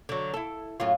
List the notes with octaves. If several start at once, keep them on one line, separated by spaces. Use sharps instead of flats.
D3 F#3
E4 A4
F#2 A2 F4